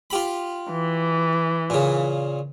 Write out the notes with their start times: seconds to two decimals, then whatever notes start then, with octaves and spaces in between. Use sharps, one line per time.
0.10 F4 G4 B5
0.71 E3
1.70 A#2 C#3